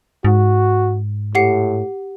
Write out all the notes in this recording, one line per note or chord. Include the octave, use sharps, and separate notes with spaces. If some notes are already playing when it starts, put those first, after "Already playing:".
G#2 F#4
A2 G4 F#5 C7